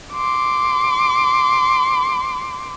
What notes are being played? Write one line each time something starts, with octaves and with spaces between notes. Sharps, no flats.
C6 D6